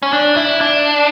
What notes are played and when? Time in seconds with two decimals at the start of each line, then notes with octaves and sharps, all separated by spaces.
0.03 C#4
0.13 D4
0.37 E4
0.61 D4